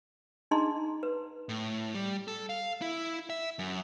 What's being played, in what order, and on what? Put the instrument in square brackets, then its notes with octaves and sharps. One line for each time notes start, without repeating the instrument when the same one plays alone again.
[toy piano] D4 D#4 G#4 D#5 A#5 C6
B4
[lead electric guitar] A2
G3
A4
F5
E4
E5
F#2